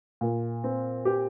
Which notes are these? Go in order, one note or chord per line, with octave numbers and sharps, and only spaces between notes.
A#2
C4
G4